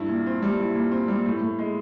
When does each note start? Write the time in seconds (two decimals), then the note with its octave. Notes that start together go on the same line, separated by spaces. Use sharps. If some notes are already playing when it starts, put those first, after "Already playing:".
Already playing: G2 E4
0.09 A#2
0.26 C4
0.42 G3
0.60 E4
0.75 A#2
0.91 C4
1.08 G3
1.26 A2
1.41 A2
1.59 G#3